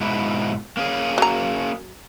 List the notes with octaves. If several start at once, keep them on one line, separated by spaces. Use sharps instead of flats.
G#2 B2 E4
A#3 C#4 G#4
F#3 A#5